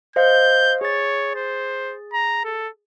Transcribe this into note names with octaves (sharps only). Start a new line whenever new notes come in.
C5 D#5 F5 G6
G#4 C#5 A6
C5
A#5
A4